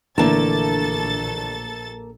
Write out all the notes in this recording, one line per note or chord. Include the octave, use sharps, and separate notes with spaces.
A#1 D3 E3 A3 A#3 A4 A5 A6